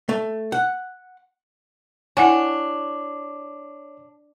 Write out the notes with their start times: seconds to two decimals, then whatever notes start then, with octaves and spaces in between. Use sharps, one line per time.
0.09 A3
0.52 F#5
2.17 D4 E4 C#5 F#5 G#5